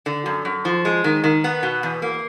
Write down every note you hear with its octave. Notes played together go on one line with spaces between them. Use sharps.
D3
F#2
F#2
F3
G#3
D#3
D#3
B3
B2
E2
A#3